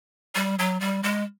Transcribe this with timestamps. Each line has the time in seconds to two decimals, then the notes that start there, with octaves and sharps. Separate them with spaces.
0.35 G3
0.59 F#3
0.81 G3
1.03 G#3